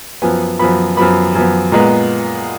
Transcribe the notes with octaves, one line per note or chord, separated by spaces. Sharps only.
F#2 F3 B3 G#5
F#2 F3 B3 B5
F#2 F3 B3 B5
F#2 F3 B3
A#2 G#3 B3 A#5